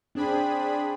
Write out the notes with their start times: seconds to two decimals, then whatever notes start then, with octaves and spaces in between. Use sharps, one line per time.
0.15 C4 D4 G#4 B5